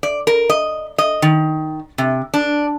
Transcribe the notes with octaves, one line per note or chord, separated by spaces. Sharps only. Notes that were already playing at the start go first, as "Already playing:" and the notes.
D5
A#4
D#5
D#5
D#3
C3
D4